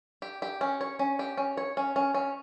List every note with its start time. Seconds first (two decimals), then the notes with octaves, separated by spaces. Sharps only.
0.22 G4
0.42 G4
0.61 C#4
0.81 C#5
0.99 C#4
1.19 G4
1.37 C#4
1.57 C#5
1.77 C#4
1.96 C#4
2.14 C#4